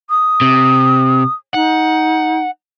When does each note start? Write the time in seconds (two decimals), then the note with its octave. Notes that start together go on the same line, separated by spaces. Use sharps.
0.10 D#6
0.41 C3
1.54 D#4 F#5